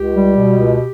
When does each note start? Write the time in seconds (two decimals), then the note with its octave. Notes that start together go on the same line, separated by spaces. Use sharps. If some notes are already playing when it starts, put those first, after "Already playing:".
Already playing: C#2 G4
0.15 G3
0.37 B2
0.58 C#2